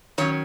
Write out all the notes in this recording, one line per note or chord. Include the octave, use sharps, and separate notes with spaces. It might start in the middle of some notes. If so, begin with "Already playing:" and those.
D#3 F#3 C#4 C#5